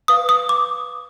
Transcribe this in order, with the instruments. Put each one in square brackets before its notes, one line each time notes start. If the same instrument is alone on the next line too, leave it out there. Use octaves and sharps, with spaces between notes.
[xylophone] B4 F5 D#6
D#6
D6